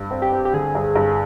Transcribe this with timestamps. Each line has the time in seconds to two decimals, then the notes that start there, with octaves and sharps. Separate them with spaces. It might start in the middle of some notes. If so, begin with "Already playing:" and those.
Already playing: G2
0.11 C4
0.22 G4
0.32 C4
0.45 G4
0.53 D3 G#4
0.75 G2
0.96 G2